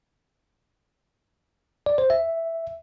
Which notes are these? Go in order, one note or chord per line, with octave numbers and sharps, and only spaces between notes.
D5
C5
E5